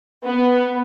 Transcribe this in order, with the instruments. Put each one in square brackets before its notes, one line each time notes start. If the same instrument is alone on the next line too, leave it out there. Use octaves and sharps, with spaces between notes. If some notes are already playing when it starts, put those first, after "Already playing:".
[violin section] B3